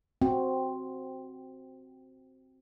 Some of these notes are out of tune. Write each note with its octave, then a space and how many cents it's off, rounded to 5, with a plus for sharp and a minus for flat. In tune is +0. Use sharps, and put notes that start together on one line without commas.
C4 +0 F#4 +5